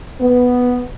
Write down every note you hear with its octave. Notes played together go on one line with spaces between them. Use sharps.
B3